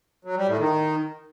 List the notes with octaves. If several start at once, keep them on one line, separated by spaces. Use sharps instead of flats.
F#3
G3
A2
D#3